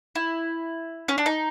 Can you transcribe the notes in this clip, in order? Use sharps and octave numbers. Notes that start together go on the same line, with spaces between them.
E4
C#4
D4
D#4